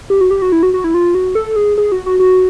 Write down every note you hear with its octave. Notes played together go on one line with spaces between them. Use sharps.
G4
F#4
G4
F#4
E4
F#4
F#4
E4
F4
F#4
A4
G#4
G#4
F#4
F#4
F#4